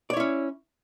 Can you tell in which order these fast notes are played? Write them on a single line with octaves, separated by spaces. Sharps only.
D5 C#5 E4 C#4